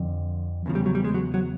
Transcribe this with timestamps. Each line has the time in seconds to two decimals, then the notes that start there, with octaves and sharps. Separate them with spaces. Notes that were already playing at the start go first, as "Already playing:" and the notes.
Already playing: F2 D3
0.66 E2 C#3 F3
0.75 G3
0.86 F#3
0.95 G3
1.04 G#3
1.14 F#3
1.34 F#3